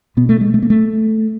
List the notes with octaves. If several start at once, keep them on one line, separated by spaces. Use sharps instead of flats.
B2 B3
A3
G#3
A3
A#3
A3